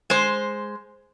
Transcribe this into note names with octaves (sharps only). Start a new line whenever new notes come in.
G#3 C5